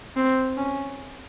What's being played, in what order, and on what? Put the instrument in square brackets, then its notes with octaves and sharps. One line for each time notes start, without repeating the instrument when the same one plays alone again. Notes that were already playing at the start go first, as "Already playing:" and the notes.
[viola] C4
C#4